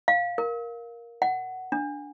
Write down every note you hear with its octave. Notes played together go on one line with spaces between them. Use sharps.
F5
A#4
F#5
D4